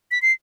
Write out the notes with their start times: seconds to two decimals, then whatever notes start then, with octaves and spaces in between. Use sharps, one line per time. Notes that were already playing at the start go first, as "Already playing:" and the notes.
0.11 B6
0.22 C7